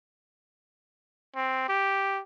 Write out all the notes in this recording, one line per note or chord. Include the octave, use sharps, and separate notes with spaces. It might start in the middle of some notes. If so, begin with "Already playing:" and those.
C4
G4